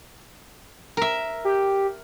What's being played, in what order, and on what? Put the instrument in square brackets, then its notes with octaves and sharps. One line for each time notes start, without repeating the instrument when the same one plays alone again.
[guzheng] A#4 E5
[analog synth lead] G4